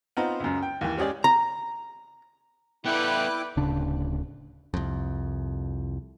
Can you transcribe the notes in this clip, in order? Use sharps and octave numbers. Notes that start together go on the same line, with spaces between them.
B3 C4 D#4 F4 C5 A#5
C#2 F#2
G5
D#2 E3
G#3 C#4 G4 G#4 D5
A#5
B3 E4 A4 B4 D5 G5 D6 F#6
D1 C#3 D4
C2 F2